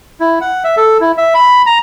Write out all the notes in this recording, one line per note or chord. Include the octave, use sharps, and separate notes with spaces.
E4
F#5
E5
A4
E4
E5
B5
A#5